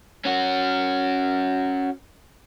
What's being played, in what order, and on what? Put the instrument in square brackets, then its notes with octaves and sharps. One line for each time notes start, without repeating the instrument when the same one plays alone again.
[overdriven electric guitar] C#4 F#4